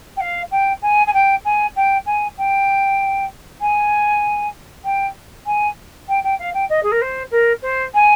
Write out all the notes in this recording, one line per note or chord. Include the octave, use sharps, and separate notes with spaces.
G5
F5
G5
G#5
G#5
G5
G#5
G5
G#5
G5
G#5
G5
G#5
G5
G5
F5
G5
D#5
G#4
A#4
C5
A#4
C5
G#5